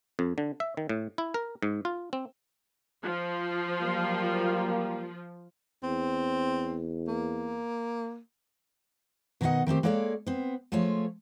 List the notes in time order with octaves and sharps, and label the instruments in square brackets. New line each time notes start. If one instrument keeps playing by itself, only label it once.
[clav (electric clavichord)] F2
D3
E5
D#3
A2
E4
A#4
G#2
F4
C4
[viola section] F3 F4
[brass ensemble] F#3 G3 A#3
[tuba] E2 [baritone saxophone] C4
[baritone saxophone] A#3
[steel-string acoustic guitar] B2 D#3 D#4 E4 D#5 F#5
D#3 A3 C4 G4
G#3 A#3 A4 C#5 D5 F5
B3 C4
F3 G#3 A3 F4 C#5